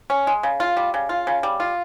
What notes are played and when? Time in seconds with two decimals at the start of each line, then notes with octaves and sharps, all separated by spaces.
0.10 C#4
0.27 G#3
0.43 C#3
0.60 F4
0.77 G3
0.94 C#3
1.09 F4
1.27 C#3
1.43 G3
1.60 F4